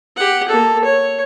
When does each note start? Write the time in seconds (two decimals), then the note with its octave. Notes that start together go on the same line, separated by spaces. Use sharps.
0.17 G4 F#5
0.49 A#3 A4
0.84 C#5